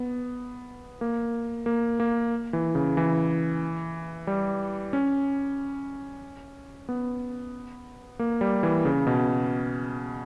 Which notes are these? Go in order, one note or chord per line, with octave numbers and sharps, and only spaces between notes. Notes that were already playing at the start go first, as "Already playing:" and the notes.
Already playing: B3
A#3
A#3
A#3
E3
C#3
E3
G3
C#4
B3
A#3
G3
E3
C#3
B2